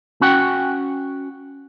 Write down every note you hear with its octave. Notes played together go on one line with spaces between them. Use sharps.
C#4 F#4 F#5 G5